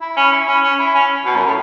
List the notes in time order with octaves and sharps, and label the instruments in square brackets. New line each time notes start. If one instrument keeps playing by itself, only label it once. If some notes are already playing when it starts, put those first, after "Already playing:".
[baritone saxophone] E4
C#4
E4
C#4
C#4
E4
C#4
B2
F#2
A2